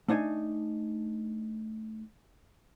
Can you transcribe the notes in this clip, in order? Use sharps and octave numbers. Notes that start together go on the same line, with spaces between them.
A3 D4 D#4 G#5